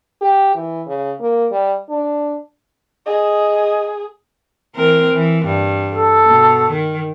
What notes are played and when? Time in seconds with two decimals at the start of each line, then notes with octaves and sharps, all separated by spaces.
0.21 G4
0.55 E3
0.87 C#3
1.20 A#3
1.51 G3
1.89 D4
3.07 G#4 D#5
4.75 E3 C4 A#4
5.12 E3
5.45 G2
5.92 A4
6.26 B2
6.70 D#3